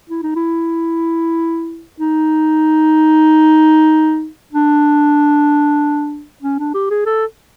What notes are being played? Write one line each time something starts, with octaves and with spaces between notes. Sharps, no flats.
E4
D#4
E4
D#4
D4
C#4
D4
G4
G#4
A4